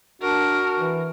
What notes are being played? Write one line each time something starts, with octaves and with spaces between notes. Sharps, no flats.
D4 F#4 A#4
E3